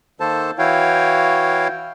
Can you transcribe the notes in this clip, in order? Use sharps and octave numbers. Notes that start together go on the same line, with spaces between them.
D#3 A#3 A4 C5 A5
E3 E4 F#4 C#5 F5 G5